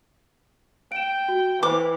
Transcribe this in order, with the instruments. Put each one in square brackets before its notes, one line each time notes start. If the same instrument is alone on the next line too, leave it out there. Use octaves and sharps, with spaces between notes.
[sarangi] G5 [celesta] D7 E7
[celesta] F#4
[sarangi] E3 [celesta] B4 C5 [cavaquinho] D6